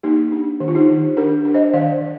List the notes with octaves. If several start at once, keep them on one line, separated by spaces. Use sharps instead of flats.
A#3 D#4 G4
D4
D#3 G4
F4
D#4 G4
D#3
D4 G4 A#4
D4
C5 D#5
D#3 D5 F5
D#3